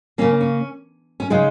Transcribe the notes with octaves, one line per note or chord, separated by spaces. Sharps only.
C#3 A#3 C#4
C#4
C#4
C#3 G#3 D#4